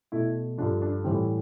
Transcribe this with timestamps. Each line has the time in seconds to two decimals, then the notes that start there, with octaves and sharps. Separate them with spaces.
0.12 B2 A3 E4
0.58 G2 D3 F3 D4
0.82 D4
1.04 A2 E3 G3 C4